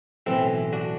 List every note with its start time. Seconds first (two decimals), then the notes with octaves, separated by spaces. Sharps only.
0.26 B1 A2 E3 C4 E4
0.73 D4 F#4